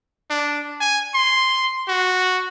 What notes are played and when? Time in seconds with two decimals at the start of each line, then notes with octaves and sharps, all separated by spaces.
0.30 D4
0.81 G#5
1.14 C6
1.88 F#4